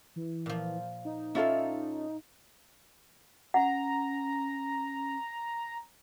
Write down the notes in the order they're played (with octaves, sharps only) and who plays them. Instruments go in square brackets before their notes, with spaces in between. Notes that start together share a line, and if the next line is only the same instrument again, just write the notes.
[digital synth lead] E3
[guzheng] A#2 F3
[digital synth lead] D#4
[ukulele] C#4 F4 A4 [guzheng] E4 F5
[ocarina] C#4 [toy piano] F#5 [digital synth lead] A#5